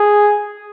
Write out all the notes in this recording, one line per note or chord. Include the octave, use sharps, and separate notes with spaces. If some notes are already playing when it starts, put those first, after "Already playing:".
Already playing: G#4